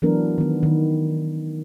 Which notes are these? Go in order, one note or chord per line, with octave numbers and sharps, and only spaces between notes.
E3 F#3 A3 B3 D4 A#4
D#3 B3
D#3